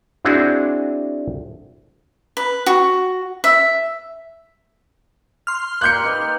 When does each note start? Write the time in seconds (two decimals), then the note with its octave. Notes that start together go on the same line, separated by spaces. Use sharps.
0.25 C4 D4 E4 F#4 G#4
2.37 B4
2.66 F#4
3.44 E5
5.47 C6 F6
5.81 A#3 G4 A#4 F#6 G6 C#7
6.04 D#4 B4